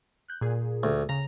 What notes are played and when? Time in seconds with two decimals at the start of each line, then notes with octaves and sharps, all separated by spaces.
0.28 F#6 G6
0.41 A#2 G#4
0.83 D2
1.09 C#3 A#5